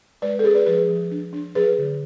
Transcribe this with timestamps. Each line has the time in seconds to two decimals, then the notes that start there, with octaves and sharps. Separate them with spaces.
0.22 G#3 B4 D5
0.39 A4
0.44 C#4 G#4 B4
0.55 B4 D5
0.66 F3 G#4 B4
0.89 F3
1.11 D4
1.33 D4
1.55 F#3 G#4 B4
1.78 D3